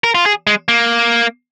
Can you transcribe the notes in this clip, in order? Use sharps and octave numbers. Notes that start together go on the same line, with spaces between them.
A#4
F4
G#4
G#3
A#3